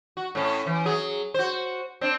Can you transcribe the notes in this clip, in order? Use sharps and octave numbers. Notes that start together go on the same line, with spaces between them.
F#4
A2 C#4
E3
F#3 G#4
F#4 C5
C4 D4